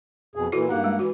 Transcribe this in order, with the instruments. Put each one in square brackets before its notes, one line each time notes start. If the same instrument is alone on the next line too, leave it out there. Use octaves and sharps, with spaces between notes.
[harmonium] F2 B2 G#4
[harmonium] A#2 E3 [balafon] E4 F#4 A4
[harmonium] G2 A#3 F#5 [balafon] D#4 G4
[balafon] G#3
[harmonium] E3 [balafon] F#4